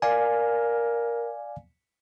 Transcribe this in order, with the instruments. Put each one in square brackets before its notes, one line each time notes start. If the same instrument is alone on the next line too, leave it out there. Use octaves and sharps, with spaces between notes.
[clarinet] A#4 [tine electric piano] D5 F5 G#5